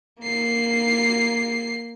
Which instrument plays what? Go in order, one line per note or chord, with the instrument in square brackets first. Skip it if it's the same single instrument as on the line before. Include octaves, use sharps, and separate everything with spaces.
[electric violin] A#3 C7